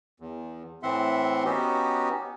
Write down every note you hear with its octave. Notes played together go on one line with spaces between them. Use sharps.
E2
A2 E3 C4 E5 F#5 C6
B3 C#4 D#4 F#4 G4